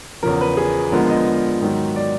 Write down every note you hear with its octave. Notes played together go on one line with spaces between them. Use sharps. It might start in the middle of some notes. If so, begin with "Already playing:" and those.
E2 C#3 F3 A#4
B4
G#4
D3 F3 G#3 B3 D4 A#4
D#5
G#2 D#3 F#3
D5